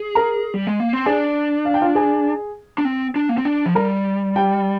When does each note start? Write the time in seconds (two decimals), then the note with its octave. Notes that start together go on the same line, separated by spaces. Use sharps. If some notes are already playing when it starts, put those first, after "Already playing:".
Already playing: G#4
0.15 A#4 A#5
0.54 G3
0.67 G#3
0.80 A#3
0.93 C4
1.06 D4 G#4 G#5
1.65 F5
1.74 G5
1.81 F4 F5
1.95 G#4 G#5
2.78 D4
2.85 C4
3.16 D4
3.29 A#3
3.38 C4
3.45 D4
3.66 F3
3.75 G3 A#4 A#5
4.36 G4 G5